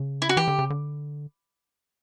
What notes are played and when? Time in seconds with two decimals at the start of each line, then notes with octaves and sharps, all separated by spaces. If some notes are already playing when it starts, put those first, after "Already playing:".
Already playing: C#3
0.22 E4
0.29 F#4
0.37 E3 G4
0.48 D3
0.59 C#3
0.70 D3